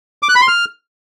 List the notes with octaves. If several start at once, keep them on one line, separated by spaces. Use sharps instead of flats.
D6
F#6
B5
C6
F6